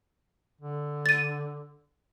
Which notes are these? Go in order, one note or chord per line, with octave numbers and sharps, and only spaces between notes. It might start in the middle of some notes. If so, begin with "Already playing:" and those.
D3
A6 D#7